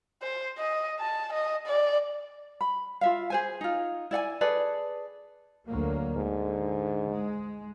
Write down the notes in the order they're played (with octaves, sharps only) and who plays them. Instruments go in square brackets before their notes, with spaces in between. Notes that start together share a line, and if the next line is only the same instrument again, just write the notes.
[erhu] C5
D#5
A5
D#5
D5
[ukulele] B5
F4 E5 F5
G#4 C5 G#5
D#4 F4
E4 D5 F#5 G#5
G#4 A4 B4 D5
[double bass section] D2 F#3 A#3
[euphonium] G#2 [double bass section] D3
[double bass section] G#3